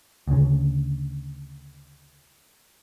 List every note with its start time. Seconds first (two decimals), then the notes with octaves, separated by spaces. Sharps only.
0.27 D2 C#3